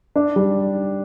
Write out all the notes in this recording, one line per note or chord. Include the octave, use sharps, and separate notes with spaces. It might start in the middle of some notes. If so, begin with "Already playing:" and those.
D4
G3